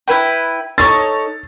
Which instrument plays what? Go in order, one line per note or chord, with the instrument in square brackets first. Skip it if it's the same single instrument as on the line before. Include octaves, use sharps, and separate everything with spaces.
[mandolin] E4 B4 G5
[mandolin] D#4 A4 C#5 [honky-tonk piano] A6